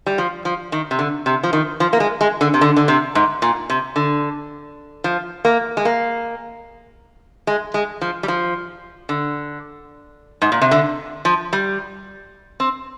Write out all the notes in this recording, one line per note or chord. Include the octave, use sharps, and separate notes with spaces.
G3
F3
F3
D#3
C3
D3
C3
F3
D#3
F3
A#3
G#3
G#3
D3
C3
D3
D3
C3
G#2
A#2
C3
D3
F3
A#3
G#3
A#3
G#3
G#3
F3
G3
F3
D3
G#2
A#2
C3
D3
F3
G3
C4